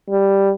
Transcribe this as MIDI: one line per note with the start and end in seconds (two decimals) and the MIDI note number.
0.10 0.52 55